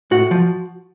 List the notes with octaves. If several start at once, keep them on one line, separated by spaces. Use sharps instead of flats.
A2 F#4
F3